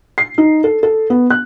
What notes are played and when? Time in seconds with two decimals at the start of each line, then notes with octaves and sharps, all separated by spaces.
0.18 C7
0.38 D#4
0.64 A4
0.83 A4
1.10 B3
1.30 F#6